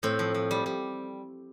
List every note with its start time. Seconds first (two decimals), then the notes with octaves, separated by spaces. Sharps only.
0.03 A2 C4
0.19 F3
0.35 F3
0.51 G3
0.66 G3